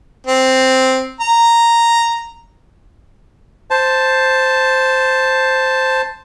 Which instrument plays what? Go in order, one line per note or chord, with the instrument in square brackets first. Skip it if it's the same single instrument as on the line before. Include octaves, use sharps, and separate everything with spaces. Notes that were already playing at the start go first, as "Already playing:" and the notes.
[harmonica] C4
A#5
[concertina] C5 A5